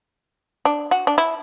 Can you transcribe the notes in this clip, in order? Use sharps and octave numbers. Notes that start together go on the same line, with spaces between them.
D4
F#4
D4
E4